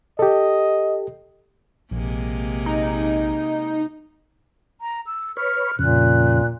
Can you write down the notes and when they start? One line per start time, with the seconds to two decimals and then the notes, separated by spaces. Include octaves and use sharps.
0.19 G4 A4 D#5
1.91 A#1 C3 G#3 A#3
2.66 D#4
4.81 A#5
5.06 E6
5.37 B4 C#5 F6
5.79 F2 A#2 C#3 F#6